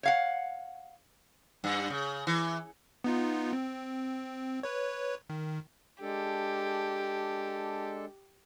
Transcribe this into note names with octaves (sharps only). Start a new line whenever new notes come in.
C#5 F5 F#5
G2
C#3
E3
B3 D#4 F4
C4
B4 C#5
D#3
G#3 D4 G4 A4